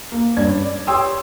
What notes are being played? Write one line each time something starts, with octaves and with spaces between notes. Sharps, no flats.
A#3
G2 C#4 D4 D5 G#6
D5
G4 C#5 G5 C6 D#6 E6